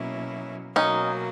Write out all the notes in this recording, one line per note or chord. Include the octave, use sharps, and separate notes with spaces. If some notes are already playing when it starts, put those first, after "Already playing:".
Already playing: B2 F#3 A#3 C#4 E4
B2 F#3 A#3 C#4 D#4